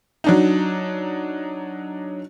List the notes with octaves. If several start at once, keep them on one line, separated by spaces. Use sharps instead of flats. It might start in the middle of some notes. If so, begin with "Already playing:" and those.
F#3 D4 D#4